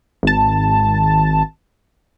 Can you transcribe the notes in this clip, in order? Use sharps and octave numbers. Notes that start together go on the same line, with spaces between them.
G#1 A5